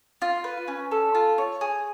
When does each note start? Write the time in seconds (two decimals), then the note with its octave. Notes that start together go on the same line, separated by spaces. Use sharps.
0.22 F4
0.44 B4
0.68 C#4
0.91 A4
1.15 F4
1.38 C#5
1.61 G#4